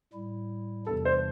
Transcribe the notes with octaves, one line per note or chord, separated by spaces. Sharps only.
A2 G3 E4
E2 C3 E3 G3 D4 A4
C5